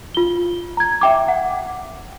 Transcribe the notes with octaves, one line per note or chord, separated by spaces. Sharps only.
F4 G7
A#5 G#6
E5 G5 D6
F#5